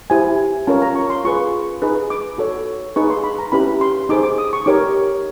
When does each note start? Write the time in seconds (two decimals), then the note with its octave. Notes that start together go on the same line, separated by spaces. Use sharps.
0.10 E4 G4 C5 G#5
0.67 C#4 F4 A#4 C#5 A5
0.82 A#5
0.95 C#6
1.10 C6
1.25 F4 G#4 B4 C#6
1.82 D#4 G#4 B4
2.10 D6
2.38 F#4 A4 C#5
2.96 D#4 G#4 B4 C#6
3.10 C6
3.24 B5
3.39 A#5
3.52 C#4 E4 G4 B4 B5
3.81 C6
4.09 D#4 G#4 C5 D6
4.23 D6
4.38 D#6
4.53 C#6
4.66 D#4 G4 A#4 C#5 D6